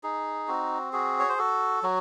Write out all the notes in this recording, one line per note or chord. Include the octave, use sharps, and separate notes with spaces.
D#4 G#4
C4 F#4
F#4 G#4
C#5
C5
F#4 A4
F#3 F#4